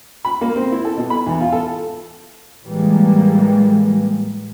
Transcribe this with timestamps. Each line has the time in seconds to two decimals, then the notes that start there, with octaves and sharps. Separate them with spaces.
0.25 B5
0.41 A#3
0.56 C4
0.72 E4
0.85 A4
0.97 B2
1.10 B5
1.27 E2
1.41 F4
1.52 A4
2.65 A2 E3 G3 G#3 A#3